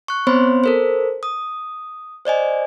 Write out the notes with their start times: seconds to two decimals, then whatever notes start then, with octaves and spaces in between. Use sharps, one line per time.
0.08 C#6 F#6
0.27 B3 C4 C5 C#5 B5 C6
0.64 A4 A#4 C5
1.23 D#6
2.25 C5 D5 D#5 G#5